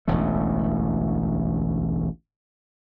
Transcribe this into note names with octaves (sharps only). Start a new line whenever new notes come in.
E1 A1 D2 A3